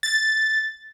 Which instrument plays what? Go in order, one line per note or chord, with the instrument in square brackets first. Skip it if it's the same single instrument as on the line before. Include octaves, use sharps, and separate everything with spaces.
[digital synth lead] A6